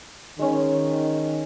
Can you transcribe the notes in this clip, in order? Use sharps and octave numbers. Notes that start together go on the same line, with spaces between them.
D#3 G#3 C#4